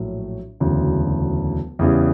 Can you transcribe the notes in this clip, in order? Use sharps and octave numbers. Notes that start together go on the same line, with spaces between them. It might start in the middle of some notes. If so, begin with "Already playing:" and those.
Already playing: A#1 A2 F#3
E1 D2 C#3 F#3
E2 C#3 E3 G3